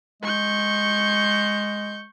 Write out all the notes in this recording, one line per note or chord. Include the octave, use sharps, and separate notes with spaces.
G#3 C#6 G6